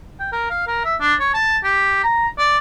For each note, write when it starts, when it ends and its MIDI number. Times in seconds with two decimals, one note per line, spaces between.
0.20 0.29 79
0.32 0.47 70
0.50 0.67 77
0.67 0.80 70
0.85 0.95 76
1.00 1.14 62
1.20 1.33 73
1.34 1.57 81
1.64 2.03 67
2.04 2.27 82
2.38 2.58 74